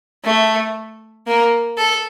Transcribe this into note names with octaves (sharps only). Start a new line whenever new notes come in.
A3
A#3
A4